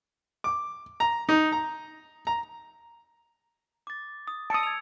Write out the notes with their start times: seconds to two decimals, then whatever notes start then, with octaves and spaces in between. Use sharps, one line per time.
0.44 D6
1.00 A#5
1.29 D#4
1.52 A#5
2.27 A#5
3.87 D6 A6
4.28 D#6
4.50 A5 D#6 E6 C#7 D7
4.63 G#6 F7